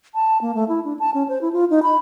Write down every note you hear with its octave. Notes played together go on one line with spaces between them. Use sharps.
A5
A#3
A3
E4
D4
A5
C#4
C5
E4
F4
D#4
B5